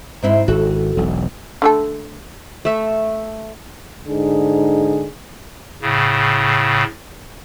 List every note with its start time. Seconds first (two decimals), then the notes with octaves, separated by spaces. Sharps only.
0.23 G#2 C4 E4
0.48 G#1 F#4 A4
0.97 E1 B1
1.62 D3 A3 A4
2.65 A3 E5
4.07 G#2 D3 D4 D#4 G#4
5.82 A2 C#3